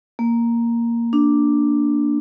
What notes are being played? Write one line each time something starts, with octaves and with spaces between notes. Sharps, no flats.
A#3
D4